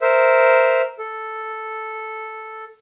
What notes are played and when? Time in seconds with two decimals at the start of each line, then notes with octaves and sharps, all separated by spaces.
0.01 A#4 C5 E5
0.99 A4